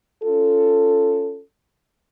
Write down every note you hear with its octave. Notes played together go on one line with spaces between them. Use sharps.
C#4 F4 A4